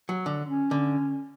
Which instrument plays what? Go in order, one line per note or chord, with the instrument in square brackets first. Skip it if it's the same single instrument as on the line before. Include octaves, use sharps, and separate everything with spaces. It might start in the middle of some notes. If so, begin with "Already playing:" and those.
[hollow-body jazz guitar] F#3
D3
[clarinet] C#4
[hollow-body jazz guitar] D3